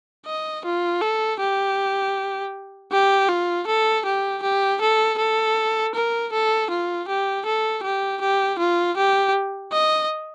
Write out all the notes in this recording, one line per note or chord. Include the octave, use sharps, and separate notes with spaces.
D#5
F4
A4
G4
G4
F4
A4
G4
G4
A4
A4
A#4
A4
F4
G4
A4
G4
G4
F4
G4
D#5